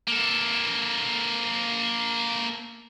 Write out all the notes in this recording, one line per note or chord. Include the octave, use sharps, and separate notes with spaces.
A#3 A4